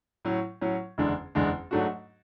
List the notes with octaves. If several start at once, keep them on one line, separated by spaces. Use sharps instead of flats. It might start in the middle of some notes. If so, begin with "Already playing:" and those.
A2 F#3 C#4
A2 F#3 C#4
F#1 E2 D3 G#3 D4
F#1 E2 D3 G#3 D4
G#2 F#3 A3 D4 F#4